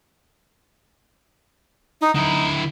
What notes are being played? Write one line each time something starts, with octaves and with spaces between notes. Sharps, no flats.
D#4
D3 D#4 E4